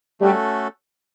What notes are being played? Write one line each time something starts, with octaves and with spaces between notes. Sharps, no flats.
G3 A3 C#4 F#4 A4